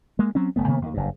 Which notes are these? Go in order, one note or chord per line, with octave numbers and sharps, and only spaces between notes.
G#3 A#3
F#3 C4 C#4
F#1 A3 B3
C3 D#3 A#3 B3
D#2 D#3
F#1 G2